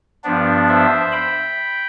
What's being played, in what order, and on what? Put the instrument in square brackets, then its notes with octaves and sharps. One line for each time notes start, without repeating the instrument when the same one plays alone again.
[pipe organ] G2 F3 B3 D4
C5 E5
G5 B5